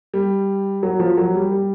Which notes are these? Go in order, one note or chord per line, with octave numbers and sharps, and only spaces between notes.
G3
F#3
F3
F#3
G3
G3